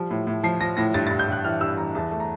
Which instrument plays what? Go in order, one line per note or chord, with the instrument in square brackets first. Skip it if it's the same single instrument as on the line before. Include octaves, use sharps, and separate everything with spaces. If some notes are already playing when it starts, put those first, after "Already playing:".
Already playing: [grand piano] F3 G3
A2
A2
F3 C7
F3 A#6
A2 A#6
G2 A6
A6
G2
G6
G2 F#6
E3 F6
G2 E6
E3 A#5
E2 A5
A3
A#5